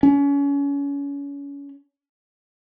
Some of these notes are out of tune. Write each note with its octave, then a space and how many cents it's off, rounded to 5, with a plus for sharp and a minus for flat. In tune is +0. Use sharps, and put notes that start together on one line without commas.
C#4 +30